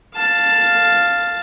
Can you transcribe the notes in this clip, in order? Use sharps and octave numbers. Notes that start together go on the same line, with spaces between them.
F5 A5